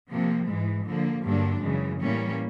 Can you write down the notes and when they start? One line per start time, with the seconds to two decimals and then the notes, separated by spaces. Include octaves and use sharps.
0.11 C3 F3 A#3
0.49 G#2 E3 G#3
0.87 D3 F3 A#3
1.25 G2 D3 F#3 A#3 D4
1.63 F#2 C#3 E3 G#3
2.01 A2 E3 G3 A#3 C#4